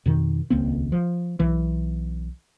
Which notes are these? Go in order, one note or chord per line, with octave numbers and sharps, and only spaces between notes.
F2 B2 D#3
D#1 C#2 A#3 C4
F3
B1 E3